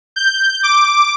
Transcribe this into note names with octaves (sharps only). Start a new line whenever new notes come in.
G6
D6